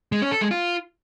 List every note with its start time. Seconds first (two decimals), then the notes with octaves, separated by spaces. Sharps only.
0.12 G#3
0.22 C#4
0.31 A4
0.41 G#3
0.51 F4